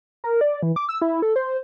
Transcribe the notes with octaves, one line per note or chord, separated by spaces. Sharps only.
A#4
D5
E3
D6
E6
E4
A4
C5